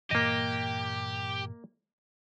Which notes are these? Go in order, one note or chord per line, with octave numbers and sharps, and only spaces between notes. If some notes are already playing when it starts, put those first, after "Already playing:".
G2 A#2 E3 A#3 G4 D#5